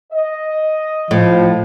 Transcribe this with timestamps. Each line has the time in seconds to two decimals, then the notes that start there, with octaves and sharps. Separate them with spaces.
0.13 D#5
1.11 A2 F3